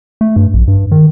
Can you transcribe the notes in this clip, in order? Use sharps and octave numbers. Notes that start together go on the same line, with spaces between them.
A3
G2
A#1
G2
D#3